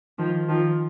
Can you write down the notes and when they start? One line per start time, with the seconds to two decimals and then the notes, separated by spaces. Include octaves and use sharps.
0.18 D#3 F3
0.48 D#3 F3